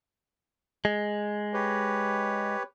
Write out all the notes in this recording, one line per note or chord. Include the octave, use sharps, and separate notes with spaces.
G#3
G4 B4 C#5